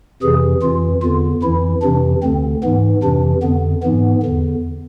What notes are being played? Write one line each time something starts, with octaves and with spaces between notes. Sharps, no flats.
F2 C3 E3 G#4
F2 E3 F4
E2 D3 F4
F2 E3 E4
F2 C3 E3 D4
D2 D3 C4
G#2 E3 B3
F2 C3 E3 D4
F2 D3 B3
G#2 E3 B3
E2 D3